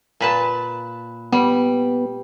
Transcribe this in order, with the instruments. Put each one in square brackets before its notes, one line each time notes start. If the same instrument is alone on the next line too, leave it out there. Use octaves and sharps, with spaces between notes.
[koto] A#2 B4 A5
[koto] G3 [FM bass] B3